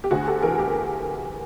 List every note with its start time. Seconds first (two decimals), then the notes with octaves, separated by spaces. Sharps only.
0.04 G4
0.11 D2 F#4 G#4
0.27 G4 A4
0.42 E3 G#4 A#4
0.59 G4